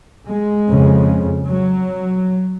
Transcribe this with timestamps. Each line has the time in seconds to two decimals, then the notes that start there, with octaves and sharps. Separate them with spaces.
0.27 G#3
0.69 F2 C#3
1.49 F#3